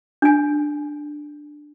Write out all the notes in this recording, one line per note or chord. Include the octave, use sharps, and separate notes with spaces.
D4 G#5